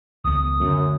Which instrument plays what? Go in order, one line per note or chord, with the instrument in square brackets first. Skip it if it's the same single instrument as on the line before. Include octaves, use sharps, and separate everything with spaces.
[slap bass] C#2 D#3 B3 [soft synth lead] D#6
[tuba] F#2 [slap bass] D3 A3